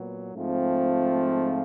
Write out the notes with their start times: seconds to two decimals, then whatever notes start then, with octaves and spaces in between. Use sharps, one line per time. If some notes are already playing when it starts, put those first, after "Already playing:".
Already playing: A#2 F#3 B3
0.34 G#2 F3 A3 C4 F4